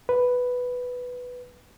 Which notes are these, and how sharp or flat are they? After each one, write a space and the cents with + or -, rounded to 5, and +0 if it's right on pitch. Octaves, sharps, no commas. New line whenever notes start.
B4 +5